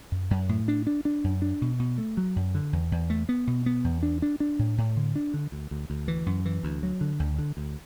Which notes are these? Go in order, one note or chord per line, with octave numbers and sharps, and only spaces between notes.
F#2
F#2
A2
D4
D4
D4
F#2
D4
B2
B2
A3
F#3
F#2
D3
E2
E2
A3
B3
B2
B3
E2
D4
D4
D4
A2
A2
D3
D4
D3
D2
D2
D2
E3
F#2
E3
D2
F#3
D3
D2
D3
D2